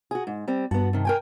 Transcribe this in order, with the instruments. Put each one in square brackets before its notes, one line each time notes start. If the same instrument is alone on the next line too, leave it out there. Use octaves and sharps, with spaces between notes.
[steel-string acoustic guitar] F#4 G#4
G#2
G3 C4
[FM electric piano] G2 A5 [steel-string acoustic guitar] B3 F#4
[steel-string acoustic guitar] C3 D#3
A#4 G5 G#5